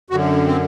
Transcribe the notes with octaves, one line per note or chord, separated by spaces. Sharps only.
F#2 D3 F#4
C4